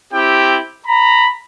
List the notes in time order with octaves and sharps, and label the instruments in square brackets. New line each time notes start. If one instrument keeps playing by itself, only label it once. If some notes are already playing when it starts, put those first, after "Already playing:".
[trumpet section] C4 E4 G4 G5
A#5 B5